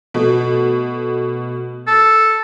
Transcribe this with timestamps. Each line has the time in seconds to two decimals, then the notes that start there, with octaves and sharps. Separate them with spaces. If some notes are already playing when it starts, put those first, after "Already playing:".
0.14 B2 A3
1.88 A4